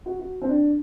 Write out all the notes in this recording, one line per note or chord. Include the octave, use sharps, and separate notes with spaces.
F#4
F#4
C4
D4